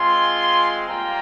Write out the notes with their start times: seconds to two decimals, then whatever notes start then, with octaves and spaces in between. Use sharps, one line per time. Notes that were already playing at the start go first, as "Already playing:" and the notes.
Already playing: G#3 C4 F4 G#5 C6
0.87 G3 A#3 F4 G5 A#5